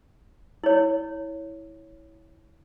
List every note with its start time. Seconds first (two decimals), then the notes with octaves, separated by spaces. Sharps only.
0.64 E4 C#5